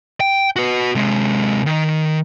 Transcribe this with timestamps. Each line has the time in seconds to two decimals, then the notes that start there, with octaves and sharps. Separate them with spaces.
0.20 G5
0.56 F#4 B4
0.95 C3 G#3
1.66 D#3